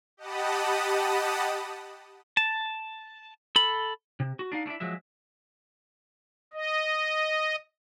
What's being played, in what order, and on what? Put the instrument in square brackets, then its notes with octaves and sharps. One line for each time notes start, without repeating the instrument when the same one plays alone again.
[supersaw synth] G4 D#5 F#5 A5 B5 D#6
[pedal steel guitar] A5
A4 B5
[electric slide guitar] C3
F#4
D4 D#4 F5
A3 D4 E4 E5
F3 F#3 G#3 E5
[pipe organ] D#5